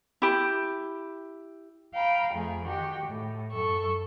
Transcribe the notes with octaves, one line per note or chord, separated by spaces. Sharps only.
E4 G4
F5 G5 A#5 B5
F2 A3 G#4
D#3 F#4 G4
A2
F#2 A4 C#6